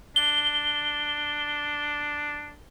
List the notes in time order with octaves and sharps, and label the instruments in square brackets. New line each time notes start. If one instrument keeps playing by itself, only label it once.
[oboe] D4 [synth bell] G7